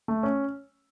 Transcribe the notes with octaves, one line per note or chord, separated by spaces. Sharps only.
A3
C#4